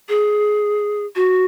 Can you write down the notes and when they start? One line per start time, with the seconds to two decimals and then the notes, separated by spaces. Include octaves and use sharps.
0.09 G#4
1.16 F#4